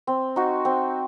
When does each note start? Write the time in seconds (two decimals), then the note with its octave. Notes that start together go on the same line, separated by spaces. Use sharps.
0.07 C4
0.36 D#4 F#4
0.65 C4